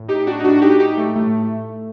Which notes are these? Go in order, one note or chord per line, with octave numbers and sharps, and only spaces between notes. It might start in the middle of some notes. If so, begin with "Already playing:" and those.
Already playing: A2
D#4 G4
D4 F#4
D#4
A2 D4 F#4
D#4 G4
D#4 G4
A3
A2 A3